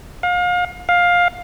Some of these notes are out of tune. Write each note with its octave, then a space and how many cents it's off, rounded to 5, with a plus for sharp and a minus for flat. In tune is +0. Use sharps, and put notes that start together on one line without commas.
F5 +35
F5 +15